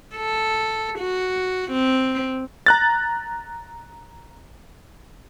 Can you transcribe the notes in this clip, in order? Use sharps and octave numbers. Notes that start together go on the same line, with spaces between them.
A4
F#4
C4
A#5 F#6 A6